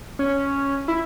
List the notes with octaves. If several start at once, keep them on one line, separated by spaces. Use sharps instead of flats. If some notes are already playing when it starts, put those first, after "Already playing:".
C#4
E4